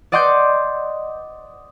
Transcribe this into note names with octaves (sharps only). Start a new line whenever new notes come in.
D5 D#5 F#5 C6 D6 G6